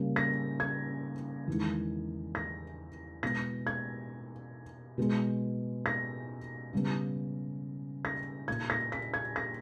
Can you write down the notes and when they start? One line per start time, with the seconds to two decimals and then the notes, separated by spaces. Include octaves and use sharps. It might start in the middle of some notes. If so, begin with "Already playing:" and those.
Already playing: C#3 G3 A#3
0.16 A#6
0.60 G#6
1.48 E2 D#3 G#3
2.35 A#6
3.23 B2 G#3 B3 A#6
3.67 G#6
4.98 B2 G#3 B3
5.86 A#6
6.73 C#3 G3 B3
8.05 A#6
8.47 A#2 A#3 G#6
8.70 A#6
8.92 B6
9.14 G#6
9.36 A#6